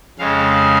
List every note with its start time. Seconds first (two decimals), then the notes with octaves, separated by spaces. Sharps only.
0.19 F2 C#3 G#3 F5